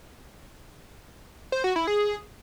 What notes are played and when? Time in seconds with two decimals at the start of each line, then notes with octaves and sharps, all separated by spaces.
1.52 C5
1.64 F#4
1.76 E4
1.87 G#4